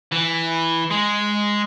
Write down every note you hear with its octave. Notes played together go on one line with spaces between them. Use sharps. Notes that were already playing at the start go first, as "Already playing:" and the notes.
E3
G#3